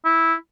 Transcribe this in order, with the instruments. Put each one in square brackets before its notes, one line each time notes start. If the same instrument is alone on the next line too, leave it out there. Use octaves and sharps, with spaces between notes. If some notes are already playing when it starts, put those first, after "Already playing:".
[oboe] E4